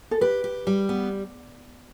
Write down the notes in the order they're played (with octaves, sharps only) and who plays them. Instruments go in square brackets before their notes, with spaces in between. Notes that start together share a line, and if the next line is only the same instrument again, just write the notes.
[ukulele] A4
[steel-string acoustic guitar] G4 [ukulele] B4
[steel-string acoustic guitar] G4
G3
B3